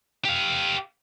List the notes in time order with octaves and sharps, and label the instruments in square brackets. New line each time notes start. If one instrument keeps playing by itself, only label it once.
[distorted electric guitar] G4 F5